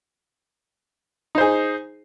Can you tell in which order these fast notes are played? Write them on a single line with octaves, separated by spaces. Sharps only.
D#4 C5 G#4